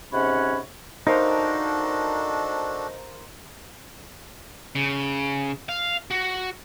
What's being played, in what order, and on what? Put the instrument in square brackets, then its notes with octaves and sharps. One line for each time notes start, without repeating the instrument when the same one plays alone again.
[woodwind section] G#2 C3 C#4 C#5 F#5 B5
[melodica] D4 F#4 A4 [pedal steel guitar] D#4 [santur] A#4 C5 F5
[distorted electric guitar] C#3
F5
F#4